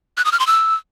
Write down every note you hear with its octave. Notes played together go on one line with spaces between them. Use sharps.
F#6
D#6
F6
C6
E6